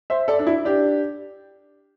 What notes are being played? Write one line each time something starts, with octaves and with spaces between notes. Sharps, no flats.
C5 E5
A4 D5
D4
E4
D4 G4